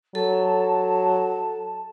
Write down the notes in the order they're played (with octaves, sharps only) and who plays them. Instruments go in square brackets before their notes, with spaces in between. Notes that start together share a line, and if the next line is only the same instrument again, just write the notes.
[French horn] F#3 [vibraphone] A4 [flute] A5